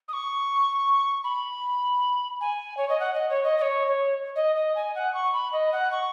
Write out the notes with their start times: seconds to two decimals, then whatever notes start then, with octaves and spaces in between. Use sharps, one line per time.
0.08 D#6
0.13 C#6
1.24 B5
2.41 G#5
2.77 C#5
2.89 D#5
3.00 F#5
3.14 D#5
3.29 C#5
3.44 D#5
3.58 D#5
3.62 C#5
3.87 C#5
4.36 D#5
4.56 D#5
4.75 G#5
4.95 F#5
5.14 C#6
5.33 B5
5.53 D#5
5.72 F#5
5.92 C#6